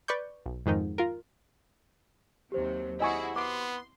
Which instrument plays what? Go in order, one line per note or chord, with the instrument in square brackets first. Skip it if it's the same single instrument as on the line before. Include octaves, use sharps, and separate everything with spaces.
[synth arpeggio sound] B4 D5 C#6 G6
B1
F2 G#2 D#3 D#4
F4 A#4
[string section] D#2 C3 F#3 [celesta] G4 C5
[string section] E4 F#4 G#4 [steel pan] D#5 G#5 C#6
[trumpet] B3 [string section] C6 [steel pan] D6